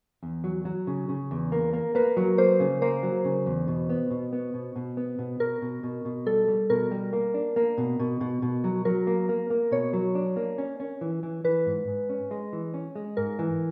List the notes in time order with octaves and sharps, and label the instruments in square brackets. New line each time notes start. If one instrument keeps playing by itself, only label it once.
[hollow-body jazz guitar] E2
F#3
F#3
C#3
C#3
E2
A#3
A#3
[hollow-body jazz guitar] A#3 [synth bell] B4
[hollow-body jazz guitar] F#3
[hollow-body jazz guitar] A#3 [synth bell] C5
[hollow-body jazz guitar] C#3
[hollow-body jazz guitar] A#3 [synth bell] C5
[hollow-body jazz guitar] F#3
C#3
E2
B2
B3
B2
B3
B2
B2
B3
B2
[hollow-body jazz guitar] B2 [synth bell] A#4
[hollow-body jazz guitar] B2
B2
B2
[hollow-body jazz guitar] G3 [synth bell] A4
[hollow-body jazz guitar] G3
[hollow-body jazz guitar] B2 [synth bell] A#4
[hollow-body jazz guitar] G3
A#3
D4
A#3
B2
B2
B2
B2
F#3
[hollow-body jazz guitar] F#3 [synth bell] A#4
[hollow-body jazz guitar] A#3
A#3
A#3
[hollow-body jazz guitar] B2 [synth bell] C#5
[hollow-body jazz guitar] F#3
D4
A#3
C#4
C#4
E3
E3
[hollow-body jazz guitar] E3 [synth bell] B4
[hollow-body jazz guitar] G#2
G#2
C#4
G#3
E3
C#4
G#3
[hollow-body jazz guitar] G#2 [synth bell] A#4
[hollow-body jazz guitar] E3